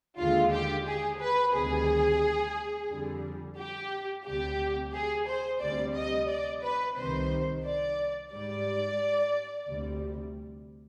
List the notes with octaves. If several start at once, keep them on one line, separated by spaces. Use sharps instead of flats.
D#2 D3 G#3 F4
G4
G#4
B4
D2 C3 D#3 G3 G#4
F2 D3 G3
G4
D2 C3 G3 G4
G#4
C5
D2 C3 G3 D5
D#5
D5
B4
C2 C3 D#3 C5
D5
G#2 G3 D5
D2 C3 G3